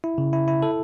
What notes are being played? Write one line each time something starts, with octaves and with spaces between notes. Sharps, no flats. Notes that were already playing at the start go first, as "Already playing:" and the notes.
E4
C#3
E4
E4
A4